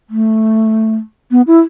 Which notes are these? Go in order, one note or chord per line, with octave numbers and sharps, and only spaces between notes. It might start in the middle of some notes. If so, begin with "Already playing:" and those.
A3
B3
E4